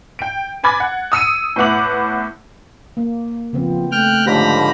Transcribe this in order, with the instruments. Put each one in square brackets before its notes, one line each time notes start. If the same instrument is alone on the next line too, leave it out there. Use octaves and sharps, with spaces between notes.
[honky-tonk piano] G5 D7
B4 G#5 B5 D6 G#6 A6
F#5
D#6 E6 C#7 D#7
A2 B3 E4 F#5 D6 F#7
[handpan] A#3
[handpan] C#3 B3 C4 [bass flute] F3
[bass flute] A3 [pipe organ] G5 F6 F#6
[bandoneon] G#2 D3 F3 [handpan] G4 C5 C#5 [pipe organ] A#5 B5